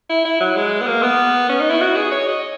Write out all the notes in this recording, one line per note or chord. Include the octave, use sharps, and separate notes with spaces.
E4
E4
F#3
G#3
B3
A#3
B3
C#4
D#4
E4
F#4
G#4
C#5
D#5